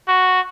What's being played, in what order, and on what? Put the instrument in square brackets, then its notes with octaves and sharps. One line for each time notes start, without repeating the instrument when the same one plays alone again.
[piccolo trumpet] F#4